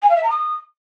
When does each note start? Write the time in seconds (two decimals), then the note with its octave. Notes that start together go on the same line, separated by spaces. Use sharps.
0.02 G#5
0.09 F5
0.16 E5
0.23 A#5
0.30 D#6